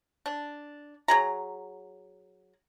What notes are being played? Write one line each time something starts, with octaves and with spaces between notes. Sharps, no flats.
D4
F#3 G#4 A#5